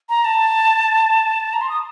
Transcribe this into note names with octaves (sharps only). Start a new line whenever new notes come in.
A#5
A5
A#5
C6
D#6